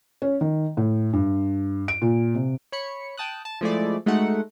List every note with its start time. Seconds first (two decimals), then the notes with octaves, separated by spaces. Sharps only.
0.22 C#4
0.41 D#3
0.77 A2
1.13 G2
1.88 D7
2.02 A#2
2.35 C3
2.72 C#5 B5 C#7
3.18 G5 A5 D#6 F#6
3.45 A5
3.61 F3 G#3 A3 E4 G#4 D5
4.06 G#3 A3 D#4 F#4 A4 F#5